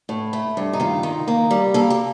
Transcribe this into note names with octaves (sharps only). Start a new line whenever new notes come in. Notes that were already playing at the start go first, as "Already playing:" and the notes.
A2
A3
G2
D#4
D#3 F4
D#3
A#3
G3
A#3 A4
G4